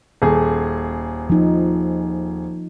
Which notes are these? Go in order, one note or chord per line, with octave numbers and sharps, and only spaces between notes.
D#1 G#4
F3 D#4